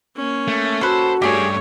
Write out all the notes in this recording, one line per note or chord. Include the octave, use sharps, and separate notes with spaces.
A#3 C#4
A3
F#4 A4 B4 C5
G2 A3 D4 G4 G#4 C#5